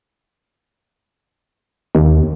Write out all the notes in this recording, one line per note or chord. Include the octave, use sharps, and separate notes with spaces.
D#2